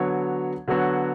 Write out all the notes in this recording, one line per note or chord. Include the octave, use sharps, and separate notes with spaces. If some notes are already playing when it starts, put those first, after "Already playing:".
Already playing: D3 F#3 B3 F#4 C#5
D3 F#3 B3 F#4 C#5